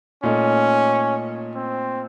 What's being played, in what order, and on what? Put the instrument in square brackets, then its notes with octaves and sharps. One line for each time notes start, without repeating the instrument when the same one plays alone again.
[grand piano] A#2 A3 D#4 [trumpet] C#4
[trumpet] C4